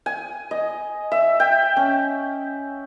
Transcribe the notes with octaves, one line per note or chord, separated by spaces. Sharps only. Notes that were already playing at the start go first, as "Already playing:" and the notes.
G#5
D#5
E5
G5
C#4